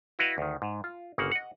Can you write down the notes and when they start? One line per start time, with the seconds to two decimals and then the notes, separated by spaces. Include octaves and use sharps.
0.19 E4 F#4 B4 D#5 F5
0.38 D2 D#3
0.62 G#2
0.84 F4
1.18 G1 C#3 A#3 F#5
1.32 D#5 F#5